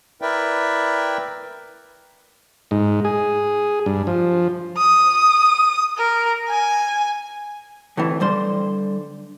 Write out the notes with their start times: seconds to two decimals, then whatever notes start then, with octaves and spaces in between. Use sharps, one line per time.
0.22 E4 A#4 B4 D5 E5 G5
2.71 G#2
3.05 G#4
3.86 G2
4.07 F3
4.77 D#6
5.98 A#4
6.49 G#5
7.97 D2 A2 C3 E3
8.20 D3 G3 C5 C6